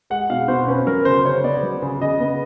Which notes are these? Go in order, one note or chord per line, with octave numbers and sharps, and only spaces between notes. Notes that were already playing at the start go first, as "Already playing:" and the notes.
G#3 F#5
B2 F5
B2 C5
C#4 B4
F#3 A#4
C#3 C5
C#3 C#5
B3 D5
F#3
C#3
C#3 D#5
B3